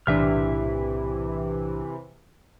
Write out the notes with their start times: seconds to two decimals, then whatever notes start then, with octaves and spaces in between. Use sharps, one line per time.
0.07 B1 A2 C3 E3 D4 G4 E5 F6